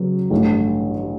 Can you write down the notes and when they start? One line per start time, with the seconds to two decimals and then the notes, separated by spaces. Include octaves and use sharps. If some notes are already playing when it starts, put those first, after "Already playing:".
Already playing: C#3 F#3 B3
0.30 A1 G2 D3